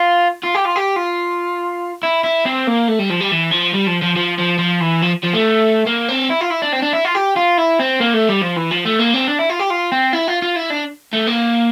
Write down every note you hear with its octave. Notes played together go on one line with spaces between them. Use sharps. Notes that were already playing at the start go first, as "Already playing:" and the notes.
Already playing: F4
F4
G4
F4
G4
F4
E4
E4
C4
A#3
A3
G3
F3
G3
E3
F3
G3
F3
F3
F3
F3
F3
E3
F3
F3
A3
A#3
C4
E4
F4
E4
D4
C4
D4
E4
F4
G4
F4
E4
C4
A#3
A3
G3
F3
E3
F3
A3
A#3
C4
D4
E4
F4
G4
F4
C4
E4
F4
F4
E4
D4
A3
A#3